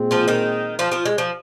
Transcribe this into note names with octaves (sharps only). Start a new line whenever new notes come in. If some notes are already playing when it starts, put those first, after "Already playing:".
Already playing: A#2 G#3 C4 G#4
F3 F4
D#3 D#4
F3 F4
F3 F4
G#3
F3